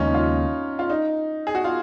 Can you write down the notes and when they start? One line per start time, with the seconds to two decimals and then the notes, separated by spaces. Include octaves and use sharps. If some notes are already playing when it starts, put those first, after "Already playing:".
Already playing: D#2 C#3 G#3 C#4 D#4 F4
0.14 F4
0.79 F4
0.90 D#4
1.47 G#4
1.55 F#4
1.64 F4